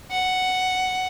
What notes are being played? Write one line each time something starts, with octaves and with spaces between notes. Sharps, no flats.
F#5